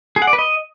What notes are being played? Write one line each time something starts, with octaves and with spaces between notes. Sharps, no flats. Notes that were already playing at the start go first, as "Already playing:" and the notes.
G#4
F#5
D5
B4
D#5